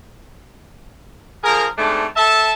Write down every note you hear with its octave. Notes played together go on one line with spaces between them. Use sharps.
D3 F3 G#4 A#4
G#2 C3 A3 D4
A4 E5 A5